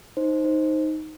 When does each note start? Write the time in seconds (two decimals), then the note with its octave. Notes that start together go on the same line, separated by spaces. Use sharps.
0.17 D#4 C5
0.44 D#4 C5